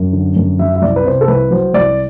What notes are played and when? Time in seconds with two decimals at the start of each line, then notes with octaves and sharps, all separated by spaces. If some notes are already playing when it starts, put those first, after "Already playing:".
Already playing: F#2
0.13 D3
0.36 F#2
0.59 F#3 E5
0.76 E5
0.82 C2 D5
0.96 B4
1.05 C3 C5
1.21 A4
1.28 C2 B4
1.51 F#3 C5
1.74 C2 D5